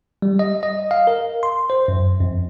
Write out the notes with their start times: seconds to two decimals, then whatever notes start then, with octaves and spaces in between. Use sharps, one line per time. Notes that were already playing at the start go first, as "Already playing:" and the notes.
0.22 G3
0.39 D#5
0.63 D#5
0.91 F5
1.07 A#4
1.43 C6
1.70 C5
1.88 F#2
2.20 F2